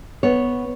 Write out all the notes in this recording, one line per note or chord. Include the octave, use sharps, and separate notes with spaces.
B3 C#5